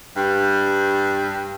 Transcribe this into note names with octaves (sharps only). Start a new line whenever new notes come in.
G2